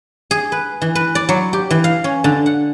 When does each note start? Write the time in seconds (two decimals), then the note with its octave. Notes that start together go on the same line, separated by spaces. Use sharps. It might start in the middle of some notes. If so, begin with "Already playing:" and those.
0.31 G#4
0.52 B4
0.82 E3
0.95 B4
1.15 D5
1.29 F#3
1.53 G4
1.71 E3
1.84 F5
2.04 C#4
2.24 D3
2.46 F#5